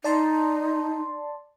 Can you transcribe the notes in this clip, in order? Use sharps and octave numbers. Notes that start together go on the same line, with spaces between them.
D#4 D5 A5 C6